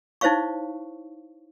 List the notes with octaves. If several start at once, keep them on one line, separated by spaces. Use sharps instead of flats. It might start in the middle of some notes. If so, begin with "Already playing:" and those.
D#4 E4 C5 C#5 F5 C#6